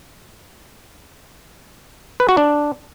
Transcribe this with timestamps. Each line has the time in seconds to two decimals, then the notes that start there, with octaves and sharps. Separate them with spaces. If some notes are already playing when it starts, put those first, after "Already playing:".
2.20 B4
2.29 F#4
2.37 D4